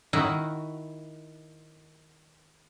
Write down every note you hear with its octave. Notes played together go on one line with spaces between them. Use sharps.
D#3 E4 F#4